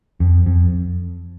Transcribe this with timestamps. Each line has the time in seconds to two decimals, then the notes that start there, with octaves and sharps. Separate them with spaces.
0.20 F2
0.46 F2